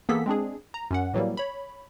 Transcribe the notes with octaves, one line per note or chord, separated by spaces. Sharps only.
E3 A#3 B3 G#4 A4 B6
G#3 C4 D4 G#4
A#5
F#2 C#4 F#5
A2 E3 F#3 G3 A#3
C#5 B5